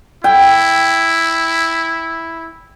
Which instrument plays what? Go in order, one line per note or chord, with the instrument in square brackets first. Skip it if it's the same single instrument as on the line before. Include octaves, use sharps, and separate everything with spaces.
[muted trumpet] E4 [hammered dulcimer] G5